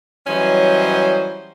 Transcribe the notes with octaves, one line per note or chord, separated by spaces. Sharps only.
E3 F#3 G3 C#4 C5 D#5